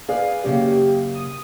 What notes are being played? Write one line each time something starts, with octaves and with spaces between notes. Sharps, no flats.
G#4 B4 D5 F5
F#2 C#3 A#3 G4
D#6